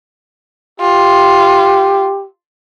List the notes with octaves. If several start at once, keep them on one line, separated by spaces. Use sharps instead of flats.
F4 G4